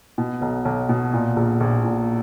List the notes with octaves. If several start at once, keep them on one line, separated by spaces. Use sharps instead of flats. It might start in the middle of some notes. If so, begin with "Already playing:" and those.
B2
B1
B1
B2
A#2
A#1
A#1
A#2